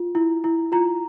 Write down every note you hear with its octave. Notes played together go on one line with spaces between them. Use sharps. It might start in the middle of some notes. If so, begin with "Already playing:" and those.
Already playing: F4
E4
E4
F4 A#5